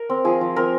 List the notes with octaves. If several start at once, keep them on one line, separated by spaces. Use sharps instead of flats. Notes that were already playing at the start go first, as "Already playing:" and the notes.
Already playing: A#4
C4
F3 G#4
F3
C4 A#4